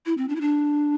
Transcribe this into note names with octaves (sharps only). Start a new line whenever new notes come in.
E4
C4
D4
E4
D4